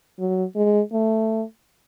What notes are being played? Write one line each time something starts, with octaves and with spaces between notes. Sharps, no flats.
F#3
G#3
A3